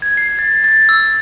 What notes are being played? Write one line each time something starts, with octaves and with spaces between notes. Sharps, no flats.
G#6
C7
A6
A6
E6